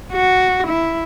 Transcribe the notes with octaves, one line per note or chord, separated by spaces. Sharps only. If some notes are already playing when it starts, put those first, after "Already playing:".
F#4
E4